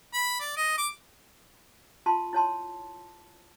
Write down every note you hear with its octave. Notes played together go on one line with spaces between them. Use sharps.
B5
D5
D#5
D6
F4 A5 C6
E4 C#5 A5 C6